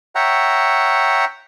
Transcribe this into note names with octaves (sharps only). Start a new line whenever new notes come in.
C#5 E5 F#5 G5 A#5